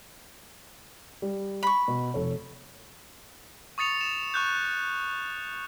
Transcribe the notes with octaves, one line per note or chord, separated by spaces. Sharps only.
G3
B5 C#6
B2
F1 A4 C#5
C#6 D#6 A6 C#7 F7
E7
C#6 F#6 G6